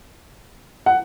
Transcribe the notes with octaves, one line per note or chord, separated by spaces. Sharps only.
F#5